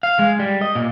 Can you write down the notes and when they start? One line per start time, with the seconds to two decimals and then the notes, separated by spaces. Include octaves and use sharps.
0.03 F5
0.19 G#3
0.39 G3
0.61 D#5
0.75 A#2